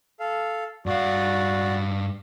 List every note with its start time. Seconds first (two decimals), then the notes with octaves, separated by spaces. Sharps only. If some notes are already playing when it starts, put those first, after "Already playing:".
0.20 A4 F5
0.86 G2 F#4 D5 F5